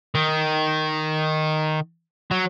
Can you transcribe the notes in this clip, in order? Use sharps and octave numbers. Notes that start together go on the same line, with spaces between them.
D#3
F#3